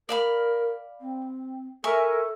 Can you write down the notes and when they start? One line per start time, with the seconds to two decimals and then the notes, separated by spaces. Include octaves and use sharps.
0.09 A#4 D5 F5 B5
1.00 C4
1.84 A4 A#4 E5 G#5 C#6